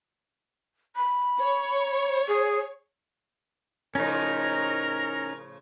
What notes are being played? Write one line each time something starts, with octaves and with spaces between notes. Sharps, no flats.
B5
C#5
G#4
A2 C#3 F3 C#4 D#4 A#4 A#5